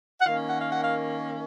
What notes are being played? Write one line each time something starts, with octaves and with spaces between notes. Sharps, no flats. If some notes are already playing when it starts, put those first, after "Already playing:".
F#5
D#3 A#3 C#4 F5
F#5
F5
F#5
F5